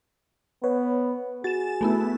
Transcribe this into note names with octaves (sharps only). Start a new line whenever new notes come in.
B3 B4 C#5
F#4 G#4 A6 E7
A3 B3 E4